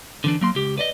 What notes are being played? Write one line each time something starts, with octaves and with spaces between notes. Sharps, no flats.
D3 E3 D4
F#3 A#3 C6
C#2 G4
B4 D5 D#5